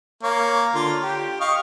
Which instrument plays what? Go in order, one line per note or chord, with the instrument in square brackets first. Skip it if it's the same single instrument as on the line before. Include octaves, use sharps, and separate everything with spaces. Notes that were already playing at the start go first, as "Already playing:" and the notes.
[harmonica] A#3 C#5
D3 F4
G4
D#5 F5 C#6